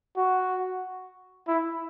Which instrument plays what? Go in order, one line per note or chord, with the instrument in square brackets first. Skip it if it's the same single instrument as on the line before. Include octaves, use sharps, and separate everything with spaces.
[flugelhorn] F#4
E4